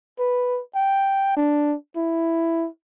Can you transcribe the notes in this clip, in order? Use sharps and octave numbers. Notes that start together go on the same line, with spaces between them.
B4
G5
D4
E4